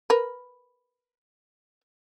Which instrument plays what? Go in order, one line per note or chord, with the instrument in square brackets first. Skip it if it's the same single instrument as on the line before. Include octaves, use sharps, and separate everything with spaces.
[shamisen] A#4 B4